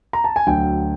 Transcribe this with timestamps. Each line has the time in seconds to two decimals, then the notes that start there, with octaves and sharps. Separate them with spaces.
0.13 A#5
0.24 A5
0.36 G#5
0.47 D2 D3 F#3 G5